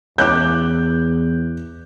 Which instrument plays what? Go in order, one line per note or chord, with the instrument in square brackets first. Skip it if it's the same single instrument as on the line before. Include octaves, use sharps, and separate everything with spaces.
[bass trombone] E2 [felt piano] D6 F#6 G6